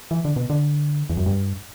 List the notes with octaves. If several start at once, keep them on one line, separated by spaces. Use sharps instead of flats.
E3
D3
B2
D3
E2
F#2
G2